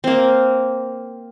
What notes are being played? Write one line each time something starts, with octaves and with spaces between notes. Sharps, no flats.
A#3 C4